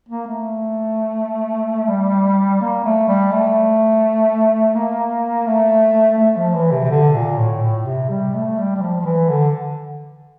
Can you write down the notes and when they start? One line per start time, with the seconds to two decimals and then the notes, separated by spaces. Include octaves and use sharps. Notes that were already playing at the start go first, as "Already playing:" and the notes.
0.09 A#3
0.27 A3
1.88 G3
2.61 A#3
2.85 A3
3.08 G3
3.32 A3
4.75 A#3
5.47 A3
6.18 A3
6.37 F3
6.55 E3
6.72 C3
6.84 C3
6.90 D3
7.15 A#2
7.38 A2
7.62 A2
7.86 C3
8.09 G3
8.34 A3
8.58 G3
8.76 G3
8.82 F3
9.01 F3
9.05 E3
9.30 D3